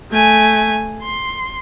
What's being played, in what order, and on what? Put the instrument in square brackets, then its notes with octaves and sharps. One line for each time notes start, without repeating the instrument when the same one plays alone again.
[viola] A3 G#5
C6